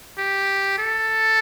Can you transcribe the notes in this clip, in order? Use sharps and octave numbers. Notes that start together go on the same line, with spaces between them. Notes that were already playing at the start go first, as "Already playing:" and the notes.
G4
A4